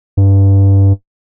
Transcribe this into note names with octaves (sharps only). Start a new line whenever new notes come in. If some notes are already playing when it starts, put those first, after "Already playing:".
G2